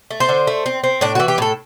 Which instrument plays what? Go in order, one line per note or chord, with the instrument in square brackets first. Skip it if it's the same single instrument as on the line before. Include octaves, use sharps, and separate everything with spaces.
[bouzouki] A3
C5
D3
A3
C4
C4
A2 D4
E3 F#4
G4
A2 A4